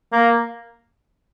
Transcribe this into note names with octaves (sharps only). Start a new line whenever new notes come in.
A#3